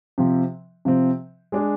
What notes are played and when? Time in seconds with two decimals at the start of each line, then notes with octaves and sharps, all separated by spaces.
0.18 C3 F3 C4
0.85 C3 F3 C4
1.52 G#3 D4 G#4